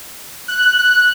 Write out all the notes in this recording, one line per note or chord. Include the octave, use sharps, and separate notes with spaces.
F#6
F#6
F#6